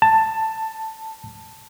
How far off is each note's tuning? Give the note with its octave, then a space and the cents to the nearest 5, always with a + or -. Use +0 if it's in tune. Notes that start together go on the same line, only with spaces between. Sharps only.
A5 +10